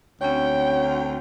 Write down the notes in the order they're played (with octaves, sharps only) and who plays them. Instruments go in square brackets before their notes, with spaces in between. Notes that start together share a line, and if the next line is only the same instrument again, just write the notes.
[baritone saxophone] D2 [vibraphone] C4 C#6 [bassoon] C#4 [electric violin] G5